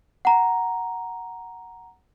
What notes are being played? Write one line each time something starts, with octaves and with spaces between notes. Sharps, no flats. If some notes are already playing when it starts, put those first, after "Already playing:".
F#5 A#5